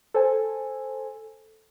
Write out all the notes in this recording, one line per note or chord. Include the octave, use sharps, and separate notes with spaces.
A4 C5 G#5